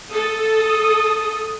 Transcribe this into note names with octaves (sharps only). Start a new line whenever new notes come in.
A4 D#6